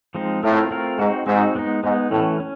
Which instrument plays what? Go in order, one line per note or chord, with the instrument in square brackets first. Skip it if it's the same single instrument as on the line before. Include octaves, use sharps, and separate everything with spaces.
[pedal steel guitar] F3 G#3 C4 D#4
[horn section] A2 [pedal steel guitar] A3 C4 F4 A#4
[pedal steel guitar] A3 C4 F4 A#4
[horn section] G#2 [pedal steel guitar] C4 D#4 F#4
[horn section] G#2 [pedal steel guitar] C4 D#4 F#4
[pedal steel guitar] G#3 B3 D#4
[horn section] G#2 [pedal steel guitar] G#3 B3 D#4
[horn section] A2 [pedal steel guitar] E3 A3 C#4
[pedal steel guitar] C#4